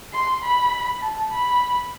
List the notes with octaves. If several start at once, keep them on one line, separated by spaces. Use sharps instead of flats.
C6
B5
A5
B5